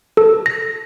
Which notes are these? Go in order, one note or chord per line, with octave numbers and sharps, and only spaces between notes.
A4
A#6